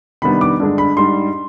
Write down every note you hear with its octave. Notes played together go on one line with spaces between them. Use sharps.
C3 D#3 G3 B3 D4 B5
D6
G2 D3 G#3 D4
B5
G#2 G3 D4 C6